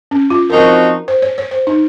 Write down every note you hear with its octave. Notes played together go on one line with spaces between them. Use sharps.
C#4
F4
F3 C4 D#4 F#4 A#4
C5
C#5
C#5
C5
D#4